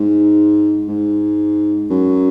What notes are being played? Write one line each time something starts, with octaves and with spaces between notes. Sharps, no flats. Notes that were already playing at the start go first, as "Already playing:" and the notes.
Already playing: G#2
G#2
F#2